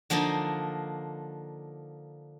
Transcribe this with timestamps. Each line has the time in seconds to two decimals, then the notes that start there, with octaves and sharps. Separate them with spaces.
0.10 D3 F3 A#3 D4 D#4